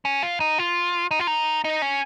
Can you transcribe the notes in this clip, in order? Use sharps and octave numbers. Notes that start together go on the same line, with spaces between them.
C#4
F4
D#4
F4
D#4
F4
D#4
D#4
C#4